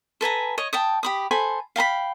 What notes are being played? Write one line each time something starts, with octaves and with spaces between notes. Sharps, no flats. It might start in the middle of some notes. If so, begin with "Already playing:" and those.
A4 B4 G#5 A#5
C#5 D#5
G5 A5 D#6
G4 B5 D#6
A4 C5 G#5 B5
F5 G5 A#5 B5